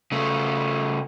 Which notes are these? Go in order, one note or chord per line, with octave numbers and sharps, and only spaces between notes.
C#3 A3